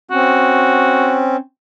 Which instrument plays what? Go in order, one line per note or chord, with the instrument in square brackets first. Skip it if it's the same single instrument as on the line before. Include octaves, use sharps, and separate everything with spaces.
[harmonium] C4 C#4 [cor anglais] F#4